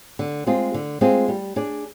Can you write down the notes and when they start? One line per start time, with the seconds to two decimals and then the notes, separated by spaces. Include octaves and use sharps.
0.19 D3
0.47 G#3 C4 F4 G#4
0.74 D3
1.01 G#3 C4 F4 G#4
1.28 G3
1.56 D4 G#4 D5